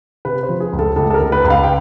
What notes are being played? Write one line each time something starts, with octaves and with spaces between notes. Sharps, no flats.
C3 B4
C5
F3
G#4
C#2
A4
C#2 A4
A4
A#4
C#2
B4
C#2
F5
G5